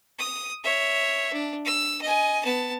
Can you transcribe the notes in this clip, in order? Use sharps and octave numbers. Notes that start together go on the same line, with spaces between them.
D#6
C#5 E5
D4
E6
D#5 G#5
B3 A5